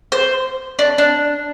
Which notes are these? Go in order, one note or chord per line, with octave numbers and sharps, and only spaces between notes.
C5
D4
D4